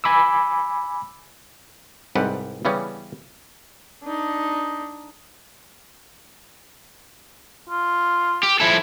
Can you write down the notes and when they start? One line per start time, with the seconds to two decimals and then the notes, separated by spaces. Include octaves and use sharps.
0.04 G#5 B5 D6 E6
2.15 C2 G#2 G3 G4 B4 F#5
2.65 C#3 E3 G3 B3 C#4
4.03 D4 D#4
7.69 F4
8.43 G4
8.60 F3 E4 A4 G#5